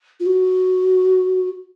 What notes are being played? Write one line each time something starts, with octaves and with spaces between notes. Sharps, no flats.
F4
F#4